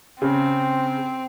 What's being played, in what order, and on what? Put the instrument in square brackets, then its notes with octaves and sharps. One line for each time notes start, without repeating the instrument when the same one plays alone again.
[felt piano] C#3 [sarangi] C4